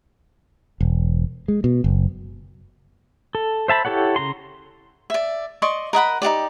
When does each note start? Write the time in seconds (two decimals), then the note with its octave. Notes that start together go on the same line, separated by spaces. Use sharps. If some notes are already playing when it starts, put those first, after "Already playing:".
0.81 E1
1.48 G#3
1.64 B2
1.84 F#1
3.35 A4
3.68 C5 E5 A5 B5
3.85 E4 G4 A4 C#5 F#5
4.16 C#3 A#5 C6
5.10 D5 E5
5.62 D5 D#5 C6 C#6
5.93 A#4 D#5 F#5 B5
6.22 D#4 F#4 G4 D5